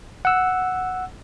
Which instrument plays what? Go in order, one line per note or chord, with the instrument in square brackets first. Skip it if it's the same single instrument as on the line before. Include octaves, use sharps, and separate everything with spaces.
[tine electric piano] F#5 E6